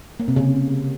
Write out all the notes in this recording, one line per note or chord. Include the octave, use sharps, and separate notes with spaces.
A#3
C3
C#3